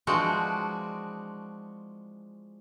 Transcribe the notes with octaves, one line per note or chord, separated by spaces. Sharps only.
E3 F3 G#3 C4 D4 F#4